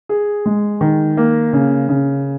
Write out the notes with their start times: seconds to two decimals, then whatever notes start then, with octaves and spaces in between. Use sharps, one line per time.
0.09 G#4
0.46 G#3
0.81 D#3
1.17 A#3
1.53 C#3
1.89 C#3